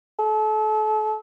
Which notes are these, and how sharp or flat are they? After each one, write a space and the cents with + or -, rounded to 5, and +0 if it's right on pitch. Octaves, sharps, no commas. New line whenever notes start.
A4 -35